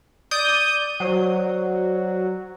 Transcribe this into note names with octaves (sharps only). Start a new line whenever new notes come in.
D5 D#6 G6
F#3 C5 D5